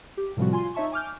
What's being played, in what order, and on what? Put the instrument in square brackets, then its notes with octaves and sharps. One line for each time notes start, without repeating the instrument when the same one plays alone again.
[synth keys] G4
A2 C3 F3 G3 C4 F#4
F4 G#5 C6
D#4 C#5 E5 A5 C#6
G#5 D6 F6 G6